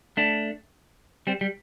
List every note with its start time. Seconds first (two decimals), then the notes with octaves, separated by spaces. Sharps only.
0.17 A3 D4
1.27 G3 C4
1.41 G3